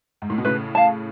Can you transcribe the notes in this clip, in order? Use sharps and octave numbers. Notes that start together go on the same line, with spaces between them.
G#2
A2
B2
A2 C#3 B4
F5 A5